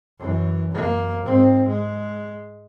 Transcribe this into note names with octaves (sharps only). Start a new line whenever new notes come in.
F#2 E3
F#2 A#3
G#2 C4
G#3